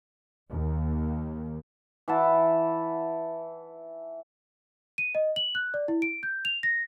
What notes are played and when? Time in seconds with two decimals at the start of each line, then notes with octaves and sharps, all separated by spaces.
0.51 D#2
2.08 E3 E5 F#5 A5
4.98 D#7
5.15 D#5
5.36 F#7
5.55 F#6
5.74 D5
5.88 E4
6.02 D7
6.23 G6
6.45 F7
6.63 A#6